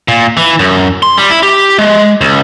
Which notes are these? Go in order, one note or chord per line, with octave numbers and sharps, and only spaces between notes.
A#2
E3
F#2
C6
G3
E4
G4
G#3
C#2